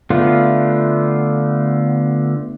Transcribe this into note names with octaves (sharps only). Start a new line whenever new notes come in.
D3 A3 B3 F4